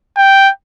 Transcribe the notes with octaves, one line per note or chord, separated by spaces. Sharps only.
G5